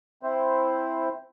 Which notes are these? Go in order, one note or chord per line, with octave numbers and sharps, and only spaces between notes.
C4 E4 C5